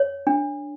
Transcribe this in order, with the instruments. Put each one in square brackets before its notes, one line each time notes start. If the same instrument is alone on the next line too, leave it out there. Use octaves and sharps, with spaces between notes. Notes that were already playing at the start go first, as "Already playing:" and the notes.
Already playing: [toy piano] C#5
D4